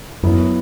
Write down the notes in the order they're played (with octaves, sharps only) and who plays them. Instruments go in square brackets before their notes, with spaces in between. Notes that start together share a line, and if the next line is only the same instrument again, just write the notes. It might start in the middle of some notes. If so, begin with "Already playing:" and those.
[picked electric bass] F#2 [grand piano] F#3 B3 E4